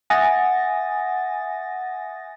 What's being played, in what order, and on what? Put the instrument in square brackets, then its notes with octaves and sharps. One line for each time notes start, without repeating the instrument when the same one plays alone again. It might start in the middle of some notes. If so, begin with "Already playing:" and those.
[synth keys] E5 F#5 G#5 D#6 A6 A#6